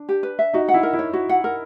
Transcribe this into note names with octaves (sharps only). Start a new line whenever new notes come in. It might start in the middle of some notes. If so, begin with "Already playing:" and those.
Already playing: D4
G4
B4
E5
D#4 F#4
F#5
E4
A#4
E4
C#5
F#4
F#5
A#4